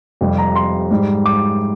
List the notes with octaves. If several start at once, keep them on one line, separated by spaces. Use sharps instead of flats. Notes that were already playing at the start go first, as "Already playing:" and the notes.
F2 C3 G3
A#5
C6
G#2 G3
D6